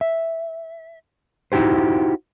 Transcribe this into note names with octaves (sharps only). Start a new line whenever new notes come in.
E5
D#4 E4 F#4 G4 C5